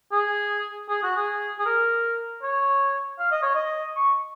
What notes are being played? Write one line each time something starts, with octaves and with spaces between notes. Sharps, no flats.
G#4
G#4
F#4
G#4
G#4
A#4
C#5
F5
D#5
C#5
D#5
C#6